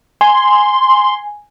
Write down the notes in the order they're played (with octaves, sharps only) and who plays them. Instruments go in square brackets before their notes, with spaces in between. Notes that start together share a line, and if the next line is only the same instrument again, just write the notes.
[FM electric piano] G#5 [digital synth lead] C6